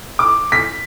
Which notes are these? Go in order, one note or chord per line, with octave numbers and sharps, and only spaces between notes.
D6
B6